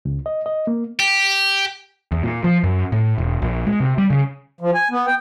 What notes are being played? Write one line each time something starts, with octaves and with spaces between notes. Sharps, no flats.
C#2
D#5
D#5
A#3
G4
E2
A#2
F3
F#2
A2
E1
A#1
G#3
C3
G3
C#3
F3
G#5
B3
G5